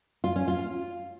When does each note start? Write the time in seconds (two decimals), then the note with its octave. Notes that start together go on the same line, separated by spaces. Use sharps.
0.24 F4
0.36 C#4
0.48 F4